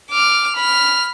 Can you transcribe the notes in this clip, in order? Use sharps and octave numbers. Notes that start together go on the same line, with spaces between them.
D6 F6
B5 F6